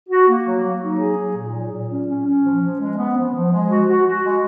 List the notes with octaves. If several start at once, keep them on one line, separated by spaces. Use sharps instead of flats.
F#4
A#3
F#3
F#3
D#4
G#4
F#3
A#2
F#3
A#2
C#4
C#4
C#4
F3
F3
G#3
B3
F3
F3
G#3
F#4
F#4
F#4
G#3